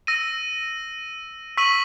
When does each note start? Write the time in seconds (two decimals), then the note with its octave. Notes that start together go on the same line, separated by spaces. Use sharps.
0.07 E6 A#6 D#7
1.57 C#6 E6 B6 D#7 F#7